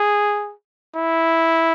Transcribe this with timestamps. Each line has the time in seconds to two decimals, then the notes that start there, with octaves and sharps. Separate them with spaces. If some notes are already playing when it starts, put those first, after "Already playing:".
Already playing: G#4
0.96 E4